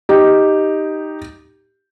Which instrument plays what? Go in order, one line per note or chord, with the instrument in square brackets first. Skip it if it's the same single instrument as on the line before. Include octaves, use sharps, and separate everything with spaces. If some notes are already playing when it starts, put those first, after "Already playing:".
[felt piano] D#4 G4